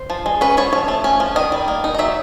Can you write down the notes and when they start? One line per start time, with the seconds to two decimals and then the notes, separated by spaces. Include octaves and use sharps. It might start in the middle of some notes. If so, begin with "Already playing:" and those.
Already playing: C5
0.10 F3
0.26 G#3
0.41 C#4 B4
0.57 F3 C#5
0.73 F3 C#5
0.88 A3
1.04 C#4
1.20 F3
1.36 D#3 D#5
1.52 G3
1.68 A#3
1.84 D#4
1.95 D#5
1.99 F#3 E5